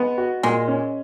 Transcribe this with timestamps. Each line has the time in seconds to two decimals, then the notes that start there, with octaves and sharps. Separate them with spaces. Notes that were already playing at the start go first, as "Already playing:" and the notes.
Already playing: G#3 B3
0.18 F#4
0.43 A#2 G#3
0.68 C#4